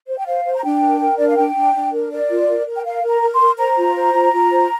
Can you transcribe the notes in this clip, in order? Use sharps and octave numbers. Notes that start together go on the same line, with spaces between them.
C5
G5
C5 F5
C5
A#5
D4 G5
A#4
A#4
D4 D5
F5
D4 G5
D4
D4
A#4
A#4 D5
F4
A#4
A#4
G5
A#4 F5
A#4
A#5
A#4
C6
A#4
C5 A#5
F4
C5
F4
F4
C5